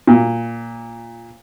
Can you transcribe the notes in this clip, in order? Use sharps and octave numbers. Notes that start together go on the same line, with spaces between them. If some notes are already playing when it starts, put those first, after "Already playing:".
A#2